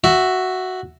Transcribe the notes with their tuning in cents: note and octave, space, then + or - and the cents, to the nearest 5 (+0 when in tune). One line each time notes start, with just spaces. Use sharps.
F#4 +0 E5 +0